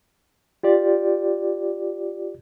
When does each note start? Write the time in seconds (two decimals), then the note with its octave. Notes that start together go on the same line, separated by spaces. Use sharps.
0.63 F4 G4 D5